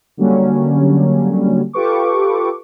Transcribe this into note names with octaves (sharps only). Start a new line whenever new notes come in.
D3 F#3 G3 A#3 C#4
F4 G4 A4 B4 C#6 D6